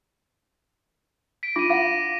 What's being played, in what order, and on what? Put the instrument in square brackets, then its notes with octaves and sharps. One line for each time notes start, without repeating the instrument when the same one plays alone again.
[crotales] B6 D7
[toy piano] D4 F4 D6 [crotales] A#6 D#7
[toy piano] E4 F5 F#5 [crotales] D6 A#6